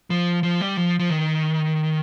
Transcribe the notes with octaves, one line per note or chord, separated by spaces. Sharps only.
F3
F3
G3
F3
F3
D#3